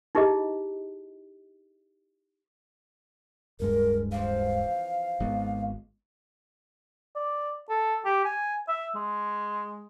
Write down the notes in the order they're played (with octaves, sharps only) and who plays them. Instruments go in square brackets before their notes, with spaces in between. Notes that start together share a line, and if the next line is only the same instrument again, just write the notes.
[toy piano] D#4 E4 G4 G#4 D#5
[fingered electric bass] D1 G2 G#3 [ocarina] A#4
[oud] E3 F3 C4 [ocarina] F5
[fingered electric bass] G#1 G#3 B3
[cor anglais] D5
A4
G4
G#5
E5
G#3